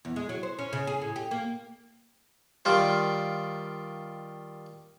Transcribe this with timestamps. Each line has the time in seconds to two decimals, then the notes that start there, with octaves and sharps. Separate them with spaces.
0.05 E2
0.16 G#3
0.29 F#3
0.43 C5
0.59 C#4
0.73 C#3
0.87 G#4
1.01 A2
1.16 G4
1.31 A#3
2.65 D#3 G3 F4 C5